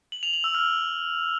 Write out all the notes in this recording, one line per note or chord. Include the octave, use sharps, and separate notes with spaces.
F#7
F7
F#7
E6
F6